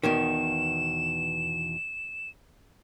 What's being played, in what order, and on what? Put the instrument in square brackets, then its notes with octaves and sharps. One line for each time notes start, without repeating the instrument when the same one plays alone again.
[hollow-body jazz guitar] E2 B2 D#3 [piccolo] E7